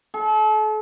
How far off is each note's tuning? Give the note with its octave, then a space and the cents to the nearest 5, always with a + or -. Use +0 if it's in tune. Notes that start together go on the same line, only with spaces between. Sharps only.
A4 -40